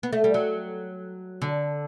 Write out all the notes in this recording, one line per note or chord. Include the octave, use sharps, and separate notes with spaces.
B3
A3
G3
F#3
D3